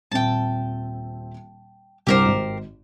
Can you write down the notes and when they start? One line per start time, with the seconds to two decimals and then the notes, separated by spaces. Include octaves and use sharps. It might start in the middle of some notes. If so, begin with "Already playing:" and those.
0.11 D#1 C4 E5 G5 A5
2.07 C2 G2 G4 A#4 C5 D6
2.26 G#1